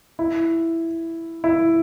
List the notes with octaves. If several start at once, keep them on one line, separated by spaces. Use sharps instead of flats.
E4
E4